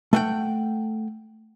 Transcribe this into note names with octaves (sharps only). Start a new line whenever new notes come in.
A3 F#5 G5